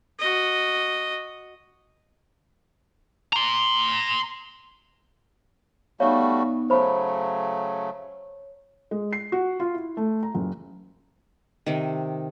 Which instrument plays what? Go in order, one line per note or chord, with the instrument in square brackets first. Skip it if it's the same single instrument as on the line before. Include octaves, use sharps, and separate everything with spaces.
[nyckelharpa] F#4 D#5
[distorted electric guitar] A#5 C6
[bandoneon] G3 A3 F#4 [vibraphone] B3 D#4 [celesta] C#5 F5
[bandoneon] C#3 F#3 A3 [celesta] C5 B5 [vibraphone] C#5
[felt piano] G#3
C7
F#4
F4
E4
A3
A#5
F#1
[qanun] C3 D#3